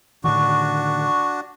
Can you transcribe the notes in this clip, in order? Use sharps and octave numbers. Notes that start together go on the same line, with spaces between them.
A2 D3 D#3 D4 F#4 C#6